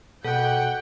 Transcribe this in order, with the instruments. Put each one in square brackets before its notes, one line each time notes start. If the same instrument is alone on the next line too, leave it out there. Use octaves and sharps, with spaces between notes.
[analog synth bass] B2 [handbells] A4 [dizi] F#5 [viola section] G5